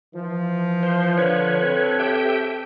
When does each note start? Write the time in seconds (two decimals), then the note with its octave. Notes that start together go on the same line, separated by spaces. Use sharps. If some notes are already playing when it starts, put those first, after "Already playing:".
0.13 E3 F3
0.83 C5
1.18 D3 F3 B4 C#5
1.60 C4 A4
1.99 G4 E5 G5